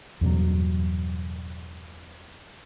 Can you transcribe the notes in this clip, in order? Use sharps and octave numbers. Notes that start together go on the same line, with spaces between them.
E2 G2 B2 F#3